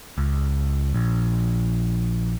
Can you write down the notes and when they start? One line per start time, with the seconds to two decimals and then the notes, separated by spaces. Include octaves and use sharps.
0.18 C#2
0.94 A#1